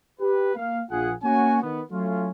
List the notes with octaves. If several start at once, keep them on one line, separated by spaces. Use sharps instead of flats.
G4 B4
A#3 F5
A#1 F4 G#4 F#5
A#3 C#4 F#4 G#5
D#3 B3
F#3 A3 C#4 F4